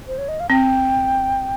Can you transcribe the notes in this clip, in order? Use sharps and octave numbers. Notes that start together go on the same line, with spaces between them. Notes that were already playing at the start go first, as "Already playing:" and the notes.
C5
C#5
D#5
F5
C4 G5